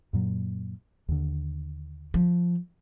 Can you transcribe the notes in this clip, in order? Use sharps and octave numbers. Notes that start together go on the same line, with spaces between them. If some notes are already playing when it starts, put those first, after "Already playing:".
F#2 A#2 F#3
D#2 D3
F3